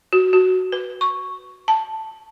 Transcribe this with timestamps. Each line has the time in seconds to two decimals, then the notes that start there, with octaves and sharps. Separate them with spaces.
0.13 F#4
0.33 F#4
0.72 B4
1.01 C#6
1.68 A5